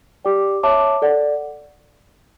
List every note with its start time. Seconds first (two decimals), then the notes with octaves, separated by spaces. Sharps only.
0.25 G4 D5 G5 D6
0.63 C#5 E5 A5 D6
1.02 A4 D5 F#5